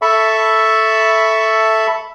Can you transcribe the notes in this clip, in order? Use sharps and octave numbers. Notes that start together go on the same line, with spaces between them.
A4 E5 A5 B5 C#6